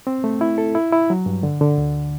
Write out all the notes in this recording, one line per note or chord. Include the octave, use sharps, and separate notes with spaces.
C4
A3
E4
A4
E4
E4
F#3
G2
D3
D3
D2